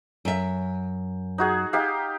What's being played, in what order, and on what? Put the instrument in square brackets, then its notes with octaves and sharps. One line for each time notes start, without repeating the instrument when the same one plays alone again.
[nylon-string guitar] F#2 E5
[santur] D#4 F#4 G#4
D#4 G4 F5